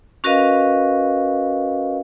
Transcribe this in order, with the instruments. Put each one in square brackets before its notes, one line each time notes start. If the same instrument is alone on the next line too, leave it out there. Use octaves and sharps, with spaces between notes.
[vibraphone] C#4 F#4 A#4 B4 D#5 F5